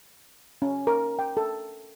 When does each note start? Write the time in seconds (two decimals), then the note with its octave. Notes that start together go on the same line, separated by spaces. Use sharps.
0.62 C#4
0.87 A#4
1.19 G5
1.37 A4